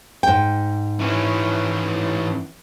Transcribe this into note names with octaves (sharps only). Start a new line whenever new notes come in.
G#2 G5
E3 C#4